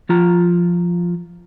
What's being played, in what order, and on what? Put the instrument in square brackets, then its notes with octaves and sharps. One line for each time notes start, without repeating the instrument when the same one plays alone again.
[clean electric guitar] F3 F4 A#5